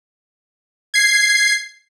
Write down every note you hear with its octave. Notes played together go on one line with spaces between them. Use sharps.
G#6 C7